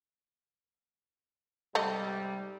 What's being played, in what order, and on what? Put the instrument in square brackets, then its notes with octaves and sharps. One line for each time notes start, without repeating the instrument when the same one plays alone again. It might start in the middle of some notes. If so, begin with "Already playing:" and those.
[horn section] G#2 C3 G3 [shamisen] A3 D#5